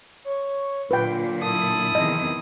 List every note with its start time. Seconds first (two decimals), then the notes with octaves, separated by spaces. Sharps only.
0.25 C#5
0.91 A#2 D3 F#3 F4 B4 G5
1.42 E4 A5 D#6
1.95 E2 C3 D#3 D#5